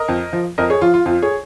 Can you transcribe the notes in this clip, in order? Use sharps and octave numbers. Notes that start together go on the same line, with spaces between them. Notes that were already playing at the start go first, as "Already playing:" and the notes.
Already playing: A#4 D#5
F2
F3
F2 A#4 D#5
G#4 C#5
F3 F4
F4
F2 F4
G#4 C#5